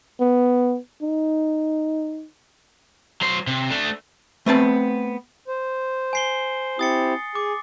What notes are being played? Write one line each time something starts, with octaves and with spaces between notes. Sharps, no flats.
B3
D#4
F#3 C5
C3
A3 D4
A3 B3 C4 A5
C5
G#5 C7 G7
C4 E4 G4 D#6 A6 C#7
G#4 D6